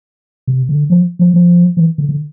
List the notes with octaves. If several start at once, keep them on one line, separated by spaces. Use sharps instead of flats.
C3
D3
F3
F3
F3
E3
D3
D3